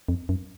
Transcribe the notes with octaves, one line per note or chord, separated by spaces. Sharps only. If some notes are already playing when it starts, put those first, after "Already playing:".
F2
F#2